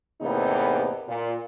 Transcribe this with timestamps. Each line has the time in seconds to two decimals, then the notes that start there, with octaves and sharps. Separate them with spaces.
0.21 E2 A2 C3 A#3 B3 D#4
1.08 A#2